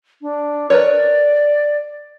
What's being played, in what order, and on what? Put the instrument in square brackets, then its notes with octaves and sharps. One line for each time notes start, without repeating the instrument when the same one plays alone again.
[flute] D4
[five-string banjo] A#4 B4 C#5 [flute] D5